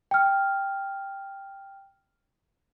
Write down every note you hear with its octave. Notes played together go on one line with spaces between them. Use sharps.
G5 F6